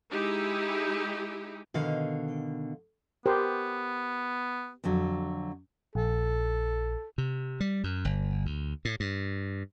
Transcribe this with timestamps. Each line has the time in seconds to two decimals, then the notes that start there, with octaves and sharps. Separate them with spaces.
0.11 G#3 D#4 E4 G4
1.74 B2 D3 D#3 F5
3.26 B3 G4 A#4 C5
4.84 F2 D3 F#3
5.95 A#1 A4
7.18 C3
7.60 G3
7.84 F#2
8.05 G1
8.45 D2
8.85 A2
9.00 G2